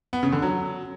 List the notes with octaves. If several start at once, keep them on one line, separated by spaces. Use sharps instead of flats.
B3
C#3
D3
F#3